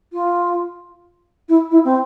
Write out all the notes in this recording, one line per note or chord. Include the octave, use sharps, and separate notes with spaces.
F4
E4
E4
C4